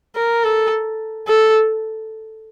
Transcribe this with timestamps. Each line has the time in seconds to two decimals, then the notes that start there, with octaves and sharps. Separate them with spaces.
0.16 A#4
0.44 A4
1.28 A4